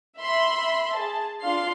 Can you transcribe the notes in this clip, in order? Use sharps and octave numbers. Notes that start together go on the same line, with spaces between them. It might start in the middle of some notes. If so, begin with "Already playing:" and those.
E5 B5 C6
G#4 A5
D4 F4 F5 C6 C7